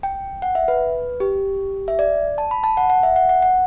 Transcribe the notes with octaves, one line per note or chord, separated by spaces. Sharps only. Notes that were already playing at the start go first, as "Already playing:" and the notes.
G5
F#5
E5
B4
G4
E5
D5
A5
B5
A5
F#5
F#5
E5
F#5
F#5
F#5